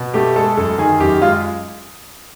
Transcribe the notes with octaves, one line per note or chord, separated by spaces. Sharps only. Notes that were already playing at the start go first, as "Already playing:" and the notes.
Already playing: B2
A3 G4
G#3 A4
F#2 A4
D#3 G#4
F#2 G4
G#3 F4